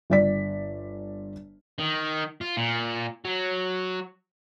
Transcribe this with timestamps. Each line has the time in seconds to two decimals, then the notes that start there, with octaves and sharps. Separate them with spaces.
0.10 G1 D5 B6
1.79 D#3
2.41 F4
2.57 A#2
3.25 F#3